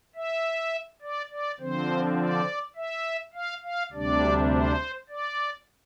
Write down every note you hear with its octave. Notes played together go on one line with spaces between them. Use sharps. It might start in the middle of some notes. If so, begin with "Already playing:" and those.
E5
D5
D5
D3 F3 C4 C5
D5
E5
F5
F5
D2 C3 G3 D4 D5
C5
D5